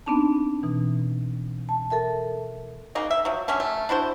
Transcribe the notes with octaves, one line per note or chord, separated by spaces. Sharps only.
B3 C4 D4 D#4 A5
B2 E3
A5
A4 A#4 E5 A5
C#3 A#3 D#4 F#4
E5
F3 F#3
D3 F#3 C#4 E5
A3
D4 E4 F#4 C5